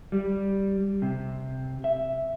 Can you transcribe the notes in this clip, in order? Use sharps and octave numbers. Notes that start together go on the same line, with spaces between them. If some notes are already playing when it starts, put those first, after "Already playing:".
G3
C3
E5